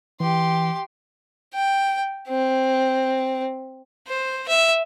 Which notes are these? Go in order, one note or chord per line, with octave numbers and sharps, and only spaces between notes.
E3 G4 C6
G5
C4
C5
E5